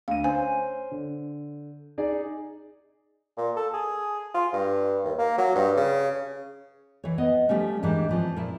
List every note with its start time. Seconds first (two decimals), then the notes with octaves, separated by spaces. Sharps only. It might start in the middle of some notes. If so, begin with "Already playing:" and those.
0.08 D2 F5 D#7
0.24 C#4 C5 G#5
0.91 D3
1.98 D#4 G#4 D5
3.37 A#2
3.56 A4
3.74 G#4
4.34 F4
4.53 G2
5.04 D#2
5.18 A#3
5.38 F#3
5.55 G2
5.77 C#3
7.04 E3 C#5
7.18 B3 D#5
7.49 F3 G3 A3 C#4
7.83 G#2 E3 G3 A#3 D4
8.09 E3 F3 C4
8.36 A#2 E4